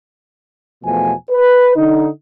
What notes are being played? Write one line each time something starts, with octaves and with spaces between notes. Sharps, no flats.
E2 B2 F3 A3 G#5
B4
D3 D#4